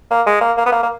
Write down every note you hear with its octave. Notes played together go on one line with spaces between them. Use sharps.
A#3
G#3
A#3
A#3
B3
A#3
A#3